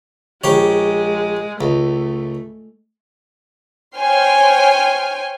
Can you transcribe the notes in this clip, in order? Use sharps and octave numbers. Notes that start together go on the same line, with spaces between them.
A#1 G#3 G4 C#5
C#2 A3
C5 C#5 G5 G#5 C6 F6